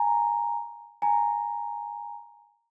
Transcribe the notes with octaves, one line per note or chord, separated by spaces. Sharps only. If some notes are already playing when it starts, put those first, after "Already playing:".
Already playing: G#5 A#5
G#5 A#5